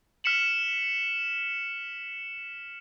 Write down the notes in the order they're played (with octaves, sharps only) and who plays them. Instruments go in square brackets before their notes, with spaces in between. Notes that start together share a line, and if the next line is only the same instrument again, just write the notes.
[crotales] F6 B6 C#7 E7 F#7